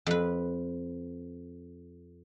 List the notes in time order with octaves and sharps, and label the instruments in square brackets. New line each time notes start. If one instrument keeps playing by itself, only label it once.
[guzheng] F2 B4